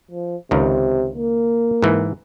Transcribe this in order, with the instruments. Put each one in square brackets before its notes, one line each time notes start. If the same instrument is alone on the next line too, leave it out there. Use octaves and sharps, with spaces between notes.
[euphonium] F3
[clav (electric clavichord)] C#2 D#3 [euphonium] C3
[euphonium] A#3
[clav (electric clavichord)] G#2 E3